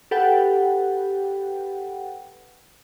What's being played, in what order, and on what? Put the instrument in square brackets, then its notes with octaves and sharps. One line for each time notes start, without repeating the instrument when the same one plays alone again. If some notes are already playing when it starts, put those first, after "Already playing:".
[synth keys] G4 A4 B4 F#5 G5